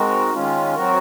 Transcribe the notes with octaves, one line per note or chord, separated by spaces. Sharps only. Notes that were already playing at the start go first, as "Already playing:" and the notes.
Already playing: G#3 C4 D#4 F#4 A#4
D#3 G#3 C#4 F4
F#3 C4 F#4 A#4